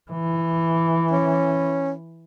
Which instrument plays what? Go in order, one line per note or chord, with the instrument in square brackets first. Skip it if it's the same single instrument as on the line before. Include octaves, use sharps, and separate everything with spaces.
[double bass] E3
[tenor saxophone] C#4